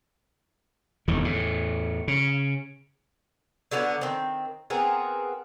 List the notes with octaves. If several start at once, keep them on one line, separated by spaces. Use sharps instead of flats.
F1 E2 D3 D#3
E2 A2
C#3
D3 F#3 B3 D4
D#3 C4
B3 C4 G#4 A#4